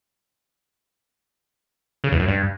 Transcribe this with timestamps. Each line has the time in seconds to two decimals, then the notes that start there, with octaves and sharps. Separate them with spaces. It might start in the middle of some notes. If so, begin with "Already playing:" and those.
2.04 C#3
2.12 E2
2.20 F#2
2.28 G2